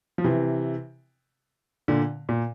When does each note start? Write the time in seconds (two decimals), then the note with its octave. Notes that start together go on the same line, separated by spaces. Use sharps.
0.18 F3
0.24 C3 E3
1.88 A#2 D3
2.29 A#2